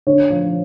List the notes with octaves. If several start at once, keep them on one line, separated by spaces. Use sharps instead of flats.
D3 C#5
F3